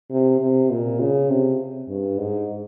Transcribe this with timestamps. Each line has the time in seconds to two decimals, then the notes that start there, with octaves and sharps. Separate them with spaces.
0.10 C3
0.40 C3
0.70 A#2
1.00 C#3
1.30 C3
1.89 G2
2.18 G#2